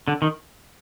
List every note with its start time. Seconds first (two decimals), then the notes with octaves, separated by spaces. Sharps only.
0.08 D3
0.22 D#3